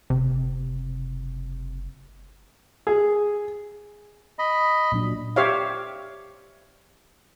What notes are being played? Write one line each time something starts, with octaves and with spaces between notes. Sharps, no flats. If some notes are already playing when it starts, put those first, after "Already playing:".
F#1 C3
G#4
D#5 B5
A#2 F#3 D4
G4 C5 C#5 E5 F5